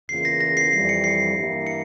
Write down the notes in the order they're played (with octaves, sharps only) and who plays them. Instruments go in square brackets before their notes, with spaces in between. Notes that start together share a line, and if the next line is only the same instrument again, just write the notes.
[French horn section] E2 C#3 E3 A#3 F4 [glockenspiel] C7
[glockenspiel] A#6
A#6
C7
[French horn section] F2 E3 G3 [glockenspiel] C7
[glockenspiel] C#7
C7
[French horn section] G2 E3 A#3 E4 G4
[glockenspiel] C#7